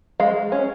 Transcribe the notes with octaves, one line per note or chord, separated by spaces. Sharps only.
G#3 F5
C#4